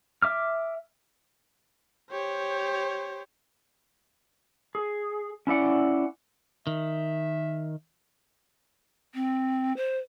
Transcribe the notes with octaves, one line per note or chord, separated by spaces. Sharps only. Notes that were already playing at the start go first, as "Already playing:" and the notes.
E5 D6 F6
G4 C5 C#5
G#4
C#4 E4 D5 F#5
D#3 E5
C4
C5